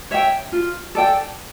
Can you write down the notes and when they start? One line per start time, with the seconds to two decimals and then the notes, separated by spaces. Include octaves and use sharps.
0.11 C#5 E5 G5
0.52 F4
0.95 A4 D5 G5